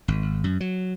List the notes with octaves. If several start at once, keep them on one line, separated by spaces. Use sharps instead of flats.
G#1
F#2
F#3